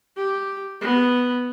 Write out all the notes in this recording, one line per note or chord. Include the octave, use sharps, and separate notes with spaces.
G4
B3